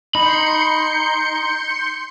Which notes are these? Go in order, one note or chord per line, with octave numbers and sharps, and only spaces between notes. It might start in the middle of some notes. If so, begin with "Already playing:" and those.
D#4 B5 C6 G6 C#7